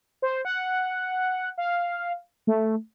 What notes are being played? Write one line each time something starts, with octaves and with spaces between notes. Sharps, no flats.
C5
F#5
F5
A3